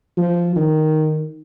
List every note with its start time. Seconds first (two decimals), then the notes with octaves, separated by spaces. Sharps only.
0.17 F3
0.56 D#3